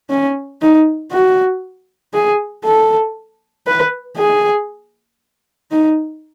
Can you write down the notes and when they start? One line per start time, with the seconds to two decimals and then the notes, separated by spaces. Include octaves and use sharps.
0.10 C#4
0.62 D#4
1.12 F#4
2.14 G#4
2.65 A4
3.67 B4
4.18 G#4
5.72 D#4